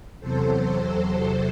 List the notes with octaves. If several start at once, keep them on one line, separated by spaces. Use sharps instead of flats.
E2 C3 F#3 A4 C5
A4 C5